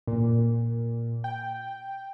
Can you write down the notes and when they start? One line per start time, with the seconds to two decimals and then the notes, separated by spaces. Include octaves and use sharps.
0.07 A#2
1.24 G5